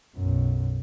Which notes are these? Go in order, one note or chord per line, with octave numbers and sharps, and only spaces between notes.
B1 F#2